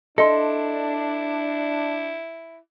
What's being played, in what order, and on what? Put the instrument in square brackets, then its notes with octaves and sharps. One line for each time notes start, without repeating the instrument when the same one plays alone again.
[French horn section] D4 [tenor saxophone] E4 [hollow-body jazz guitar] A4 [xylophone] D#5 C6